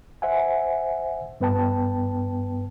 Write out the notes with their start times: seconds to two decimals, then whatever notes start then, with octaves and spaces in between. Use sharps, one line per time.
0.22 C5 E5 F#5 G#5
1.40 G2 B3 B4 G5 A5